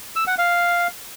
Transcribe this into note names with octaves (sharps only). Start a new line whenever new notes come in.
E6
F#5
F5